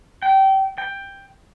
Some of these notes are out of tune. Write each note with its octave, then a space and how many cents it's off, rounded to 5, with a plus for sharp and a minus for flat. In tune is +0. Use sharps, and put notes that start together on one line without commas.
G5 -25
G5 +10